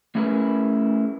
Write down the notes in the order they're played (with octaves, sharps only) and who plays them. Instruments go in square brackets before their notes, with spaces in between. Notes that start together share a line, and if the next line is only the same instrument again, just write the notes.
[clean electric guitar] A3 C#4 E4 G#4 A#4 B4